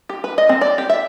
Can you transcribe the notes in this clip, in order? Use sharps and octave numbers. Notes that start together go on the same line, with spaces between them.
G4
B4
D#5
C4
D5
G4
E5